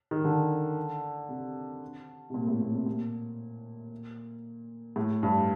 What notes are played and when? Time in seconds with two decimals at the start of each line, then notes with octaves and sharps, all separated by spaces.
0.11 D#3
0.25 D3
1.29 C3
2.30 C3
2.34 A#2
2.47 A2
2.60 A#2
2.73 C3
2.86 A#2
4.96 A2
5.23 G2